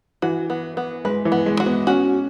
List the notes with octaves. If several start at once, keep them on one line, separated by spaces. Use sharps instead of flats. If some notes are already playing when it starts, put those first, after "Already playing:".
E3 F#4
B3
B3
G#3 B4
E3
B3
G#3
F#4
B3
C#4 F#4